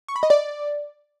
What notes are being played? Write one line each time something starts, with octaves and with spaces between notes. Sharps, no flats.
C#6
B5
D#5
D5